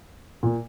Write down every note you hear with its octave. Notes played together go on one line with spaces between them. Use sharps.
A#2